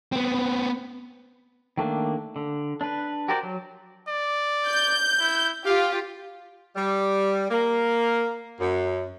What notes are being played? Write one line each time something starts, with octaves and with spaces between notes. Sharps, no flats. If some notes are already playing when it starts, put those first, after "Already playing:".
B3 C4
D#3 A3 A#3 D4
D3
D4 B4
F#4 G4 A#4 C5 D5
F#3
D5
G6
E4
F4 G4 F5
G3
A#3
F#2